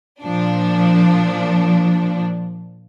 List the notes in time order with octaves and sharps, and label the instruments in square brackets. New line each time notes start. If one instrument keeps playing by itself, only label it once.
[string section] A#2 F3 D4